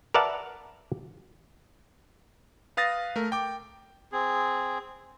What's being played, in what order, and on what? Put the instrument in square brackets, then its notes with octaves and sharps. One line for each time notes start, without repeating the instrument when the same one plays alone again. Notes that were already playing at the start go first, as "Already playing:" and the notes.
[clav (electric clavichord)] A#4 B4 D5 E5 F#5 A5
[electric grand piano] B4 F5 D#6 A6 A#6
A3 A#4
G5 D6
[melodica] C4 G#4